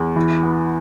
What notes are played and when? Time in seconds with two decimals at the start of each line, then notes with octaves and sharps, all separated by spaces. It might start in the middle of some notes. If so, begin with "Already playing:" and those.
Already playing: E2
0.16 E3
0.43 B3